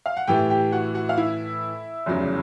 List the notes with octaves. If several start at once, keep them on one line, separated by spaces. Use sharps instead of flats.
F5
F#5
A2 E3 A3 G4 G5
G4 G5
F#4 F#5
F#4 F#5
F5
E4 E5
F1 E2 C#3 F#3